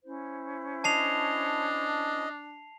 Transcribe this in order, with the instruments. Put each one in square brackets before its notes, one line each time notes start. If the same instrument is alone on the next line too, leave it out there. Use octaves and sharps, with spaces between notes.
[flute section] C#4 E4 C5
[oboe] D4 [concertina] D#5 [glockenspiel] A5 C7 F7